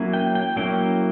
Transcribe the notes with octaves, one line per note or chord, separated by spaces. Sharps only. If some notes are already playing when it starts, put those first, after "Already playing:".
Already playing: F#3 A#3 C#4 E4
G5
G5
F#3 A#3 C#4 E4 G5